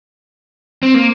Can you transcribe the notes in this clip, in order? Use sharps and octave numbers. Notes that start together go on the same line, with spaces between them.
C4
A#3